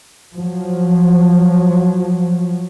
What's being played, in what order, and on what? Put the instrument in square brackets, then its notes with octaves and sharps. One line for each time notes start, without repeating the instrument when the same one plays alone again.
[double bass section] F3 F#3